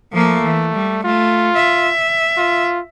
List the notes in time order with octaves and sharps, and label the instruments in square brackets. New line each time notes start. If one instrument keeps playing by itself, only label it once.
[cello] F3 A#3 [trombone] A3
[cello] E3
G3
[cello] A3 [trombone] F4
[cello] E5
[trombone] F4